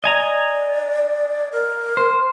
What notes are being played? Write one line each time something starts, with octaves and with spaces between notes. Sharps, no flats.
D5 D#5 G#5 A#5
A#4
C5